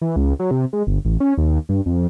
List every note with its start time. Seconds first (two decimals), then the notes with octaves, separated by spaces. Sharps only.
0.01 E3
0.16 C#2
0.39 F#3
0.51 C3
0.73 G#3
0.87 G1
1.05 A1
1.20 C#4
1.37 D#2
1.69 G2
1.86 F2